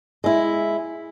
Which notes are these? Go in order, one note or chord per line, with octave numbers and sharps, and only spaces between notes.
G#3 E4